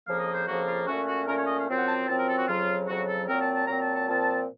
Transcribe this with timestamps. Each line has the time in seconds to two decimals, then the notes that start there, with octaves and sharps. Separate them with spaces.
0.07 F2 C#3 F3 A#3 F5
0.20 D#5
0.33 C5
0.47 F2 C#3 F3 A#3 F#4
0.66 F4
0.87 A#2 A3 C#4 F#4
1.07 F#4
1.27 A#2 A3 C#4 A#4
1.37 C#5
1.47 D#5
1.58 F5
1.68 F#2 F3 C4
1.77 F#5
1.87 A5
2.07 F#2 F3 C4 A5
2.18 A#4
2.28 A4
2.38 F#4
2.48 F2 C#3 F#3 F4
2.87 F2 C#3 F#3 F#4
3.08 A4
3.28 A#2 F#3 C4 A#4
3.41 A5
3.54 A5
3.67 A#2 F#3 C4 A#5
3.81 A5
3.95 A5
4.07 A#2 F3 C4 A5